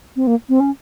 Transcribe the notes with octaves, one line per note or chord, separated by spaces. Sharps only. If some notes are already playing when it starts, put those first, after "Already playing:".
C4
A#3
C4
C#4